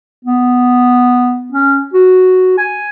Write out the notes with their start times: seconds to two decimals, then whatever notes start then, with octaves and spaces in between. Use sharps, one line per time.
0.25 B3
1.52 C#4
1.94 F#4
2.58 G#5